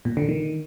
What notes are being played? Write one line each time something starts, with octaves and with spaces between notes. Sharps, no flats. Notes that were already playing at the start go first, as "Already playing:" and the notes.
A#2
D3
D#3